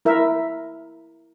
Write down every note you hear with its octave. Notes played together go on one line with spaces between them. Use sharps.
E4 A#4 E5